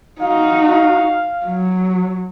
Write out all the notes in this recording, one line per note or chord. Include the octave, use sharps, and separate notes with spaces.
D#4 F#4 F5
F#3